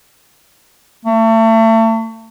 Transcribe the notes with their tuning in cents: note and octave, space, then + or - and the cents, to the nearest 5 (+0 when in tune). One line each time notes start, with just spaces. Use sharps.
A3 +35